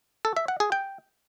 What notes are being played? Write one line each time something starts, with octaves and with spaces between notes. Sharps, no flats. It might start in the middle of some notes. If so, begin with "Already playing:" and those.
A4
E5
F#5
G#4
G5